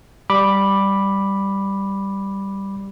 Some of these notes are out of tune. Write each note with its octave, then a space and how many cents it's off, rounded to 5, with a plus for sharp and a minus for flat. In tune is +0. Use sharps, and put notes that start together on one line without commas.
G3 +0 B5 -5 D6 +0